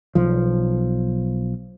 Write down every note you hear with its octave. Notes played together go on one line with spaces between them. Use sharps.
B1 F3